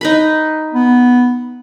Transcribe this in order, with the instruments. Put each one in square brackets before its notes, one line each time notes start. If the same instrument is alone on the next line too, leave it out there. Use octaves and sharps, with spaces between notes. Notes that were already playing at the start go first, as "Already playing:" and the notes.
[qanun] D#4 B4 B5
[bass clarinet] B3